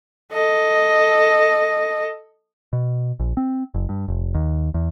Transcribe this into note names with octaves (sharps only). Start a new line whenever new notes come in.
A4 D#5
B2
A#1
C4
F#1
G2
F1
D#2
E2